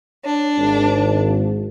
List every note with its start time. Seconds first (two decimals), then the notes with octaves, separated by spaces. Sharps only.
0.25 D4 C#5
0.57 G#1